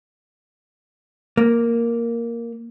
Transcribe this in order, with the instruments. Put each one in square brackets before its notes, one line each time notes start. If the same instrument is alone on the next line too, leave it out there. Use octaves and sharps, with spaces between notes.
[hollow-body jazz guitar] A#3